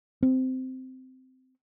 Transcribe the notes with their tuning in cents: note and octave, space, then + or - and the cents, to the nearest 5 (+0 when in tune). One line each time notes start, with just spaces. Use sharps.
C4 -15